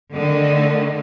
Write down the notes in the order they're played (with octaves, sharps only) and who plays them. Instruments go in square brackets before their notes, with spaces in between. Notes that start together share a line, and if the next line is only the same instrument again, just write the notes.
[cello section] D3 D#3 A3